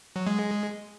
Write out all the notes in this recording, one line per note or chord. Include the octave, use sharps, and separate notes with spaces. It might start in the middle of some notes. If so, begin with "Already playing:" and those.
F#3
G#3